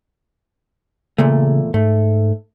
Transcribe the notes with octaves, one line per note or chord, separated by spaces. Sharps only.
E2 A#2 C#3 A3
G#2 A3